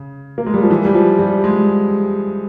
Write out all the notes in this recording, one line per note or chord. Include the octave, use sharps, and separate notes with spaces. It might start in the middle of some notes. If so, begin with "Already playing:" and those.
Already playing: C#3
A#3
G#3
G3
F3
E3
G3
F3
G3
G#3